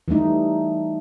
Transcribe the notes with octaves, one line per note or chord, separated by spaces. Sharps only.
E3 G3 A3 D#4